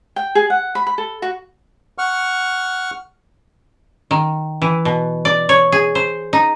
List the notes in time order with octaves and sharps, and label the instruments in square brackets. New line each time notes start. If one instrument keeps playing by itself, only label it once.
[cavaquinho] G5
G#4
F#5
B5
B5
A4
F#4
[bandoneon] F#5 C#6 F6
[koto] D#3
E3
B2
D5
C#5
G#4
C5
D#4